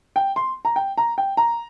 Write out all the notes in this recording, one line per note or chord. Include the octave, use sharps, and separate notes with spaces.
G5
C6
A#5
G5
A#5
G5
A#5